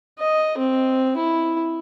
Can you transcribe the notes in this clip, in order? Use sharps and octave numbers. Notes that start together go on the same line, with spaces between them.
D#5
C4
E4